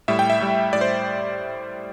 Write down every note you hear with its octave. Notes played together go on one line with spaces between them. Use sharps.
A2 G3 E5
G5
E5
A2 G3
A2 G3 D5
C5